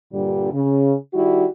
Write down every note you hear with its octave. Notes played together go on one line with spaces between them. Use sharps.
G2 A#2 D3 G3
C#3
D#3 G3 E4 F#4